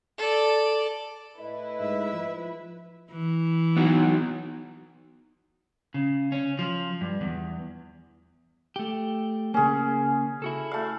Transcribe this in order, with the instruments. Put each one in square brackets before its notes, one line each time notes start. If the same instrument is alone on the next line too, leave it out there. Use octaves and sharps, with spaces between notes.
[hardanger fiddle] A4 D5
[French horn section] A2 D#5 [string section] E4 B4
[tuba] G#2 [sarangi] E5
[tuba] F3
[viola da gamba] E3
[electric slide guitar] B3 D#4 F#4
[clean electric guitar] C#3
C#4
F3
G2
E2
A3 G4
[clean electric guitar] C#3 A#3 [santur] C#4 G#4
[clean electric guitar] E4 F#4 A4
[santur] A3 F5